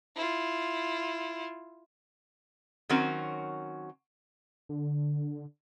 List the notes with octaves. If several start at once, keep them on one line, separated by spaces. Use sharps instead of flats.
E4 F4
D#3 F#3 C4 C#4 F#4 A#4
D3